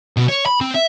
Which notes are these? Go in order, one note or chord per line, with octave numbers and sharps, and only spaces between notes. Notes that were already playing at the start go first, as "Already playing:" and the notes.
B2
C#5
B5
C4
E5